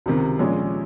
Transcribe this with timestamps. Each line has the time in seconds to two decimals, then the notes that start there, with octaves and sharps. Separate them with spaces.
0.06 C#2 C3 D#3
0.39 A#1 A#2 G#3 C#4